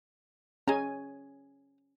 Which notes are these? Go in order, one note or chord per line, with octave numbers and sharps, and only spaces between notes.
C#4 G#4 D#5 G#5 A#5